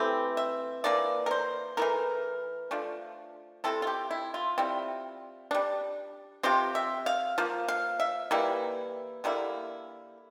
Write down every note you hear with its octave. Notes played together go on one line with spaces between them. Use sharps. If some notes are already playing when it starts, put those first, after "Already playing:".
Already playing: E3 A3 C4 E4 G4
E5
E3 A#3 D4 D5
A#4
C5
E3 A3 E4 A#4
F3 A3 D4
C3 F3 C4 E4 A4
F4
G4
E4
F4
G3 C4 E4
G3 D4
C3 F3 C4 G4
E5
F5
F3 A#3
F5
E5
E3 G3 A#3 E4
D3 G3 A#3 E4